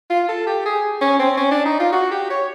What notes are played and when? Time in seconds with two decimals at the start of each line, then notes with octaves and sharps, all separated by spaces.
0.10 F4
0.29 A4
0.47 G4
0.65 G#4
1.01 C#4
1.19 C4
1.37 C#4
1.51 D4
1.65 D#4
1.80 F4
1.93 F#4
2.11 G4
2.30 C#5